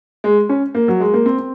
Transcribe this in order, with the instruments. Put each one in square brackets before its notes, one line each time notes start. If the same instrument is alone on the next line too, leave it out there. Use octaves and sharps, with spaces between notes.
[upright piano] G#3
C#4
A#3
F#3
G#3
A#3
C4
C4